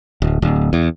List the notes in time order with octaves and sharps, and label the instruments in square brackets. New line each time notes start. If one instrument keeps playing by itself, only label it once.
[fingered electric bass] D1
D1
E2